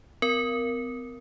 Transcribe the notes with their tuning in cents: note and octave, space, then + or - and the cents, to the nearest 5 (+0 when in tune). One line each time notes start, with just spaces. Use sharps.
C4 -45 A#4 +0